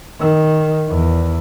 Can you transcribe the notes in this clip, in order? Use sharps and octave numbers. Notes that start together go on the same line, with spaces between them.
D#3
E2